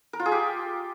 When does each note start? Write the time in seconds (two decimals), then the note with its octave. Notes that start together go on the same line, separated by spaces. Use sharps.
0.13 A#4
0.19 F4
0.26 G#4
0.32 G4